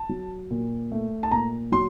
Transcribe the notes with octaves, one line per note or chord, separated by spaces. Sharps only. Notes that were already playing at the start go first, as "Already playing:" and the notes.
Already playing: A5
F#3
A#2
A3
A5
A#2 A#5
F#3 C6